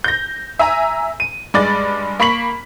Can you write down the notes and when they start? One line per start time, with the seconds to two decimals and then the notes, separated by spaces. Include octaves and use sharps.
0.04 G6 A#6
0.59 E5 G#5 A#5
1.20 D#7
1.54 G2 G#3 D5 A6
2.20 A#3 B5 C#6 B6 F#7